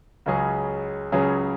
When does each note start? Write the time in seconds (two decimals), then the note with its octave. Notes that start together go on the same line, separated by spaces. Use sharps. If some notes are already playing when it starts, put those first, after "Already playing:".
0.26 C#2 C#3 F#3 C#4 G#4
1.12 C#2 C#3 F#3 C#4 G#4